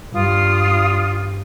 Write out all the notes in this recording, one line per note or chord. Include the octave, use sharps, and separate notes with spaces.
G2 F4 F5 D#6